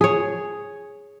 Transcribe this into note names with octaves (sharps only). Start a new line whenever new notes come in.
G#4 C#5